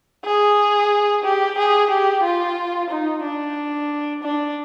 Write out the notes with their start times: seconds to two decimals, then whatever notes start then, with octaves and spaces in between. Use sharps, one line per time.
0.25 G#4
1.23 G4
1.58 G#4
1.90 G4
2.23 F4
2.90 D#4
3.23 D4
4.23 D4